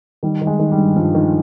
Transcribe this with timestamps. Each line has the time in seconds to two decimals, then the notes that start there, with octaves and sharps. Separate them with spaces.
0.23 D#3 G3
0.42 D#3
0.47 G#3
0.59 D#3
0.72 G3
0.78 G2
0.96 G2 F3
1.15 D#3